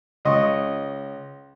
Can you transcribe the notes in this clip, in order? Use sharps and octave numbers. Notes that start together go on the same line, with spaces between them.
C#2 D#5 C#6